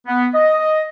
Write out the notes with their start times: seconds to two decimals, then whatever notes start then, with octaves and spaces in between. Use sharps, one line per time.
0.07 B3
0.34 D#5